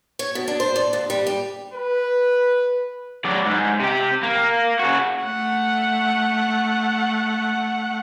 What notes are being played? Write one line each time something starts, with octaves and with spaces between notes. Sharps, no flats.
C#5
B2
D4
C5
D5
D#2
G3
G4
B4
F#3 D5
G#2
C3 G4
A#3
C#3 F#4
A3 F#5